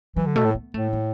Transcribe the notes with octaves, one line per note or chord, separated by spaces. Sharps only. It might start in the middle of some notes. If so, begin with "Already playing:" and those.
E3 F#3
D3
B2 A3
A2
B3
A2 A3
A3